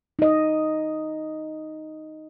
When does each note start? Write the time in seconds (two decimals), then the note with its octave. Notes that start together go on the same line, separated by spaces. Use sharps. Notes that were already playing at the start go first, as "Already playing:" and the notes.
0.19 D#4 D#5